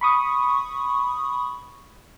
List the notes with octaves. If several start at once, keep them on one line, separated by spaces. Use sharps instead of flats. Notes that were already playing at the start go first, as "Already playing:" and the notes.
B5 C#6 D#6